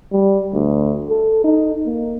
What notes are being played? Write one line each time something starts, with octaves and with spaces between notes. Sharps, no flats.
G3
D2
A4
D#4
A#3